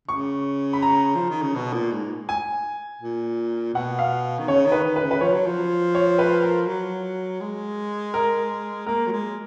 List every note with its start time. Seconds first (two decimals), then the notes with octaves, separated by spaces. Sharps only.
0.08 C#3 C#6
0.73 B5
0.82 A#5
1.15 F3
1.30 D#3
1.42 C#3
1.55 B2
1.73 A#2
1.92 G#2
2.29 G#5
3.02 A#2
3.74 B2 F#5
3.99 F5
4.39 D#3
4.48 C#3 C#5
4.66 D#3
4.72 B4
4.84 D#3
4.96 B4
5.03 C#3
5.11 B4
5.21 F3 C#5
5.33 F#3
5.47 F3
5.95 C#5
6.19 B4
6.43 A#4
6.67 F#3
7.41 G#3
8.14 A#4
8.86 A#3 A#4
9.07 F#3
9.12 G#3